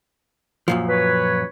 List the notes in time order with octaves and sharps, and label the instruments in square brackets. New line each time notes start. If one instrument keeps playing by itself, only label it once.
[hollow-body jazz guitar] F#2 A#2 F3
[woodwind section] B4 C#5